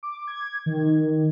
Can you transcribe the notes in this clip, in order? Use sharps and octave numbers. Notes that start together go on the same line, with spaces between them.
D6
G#6
D#3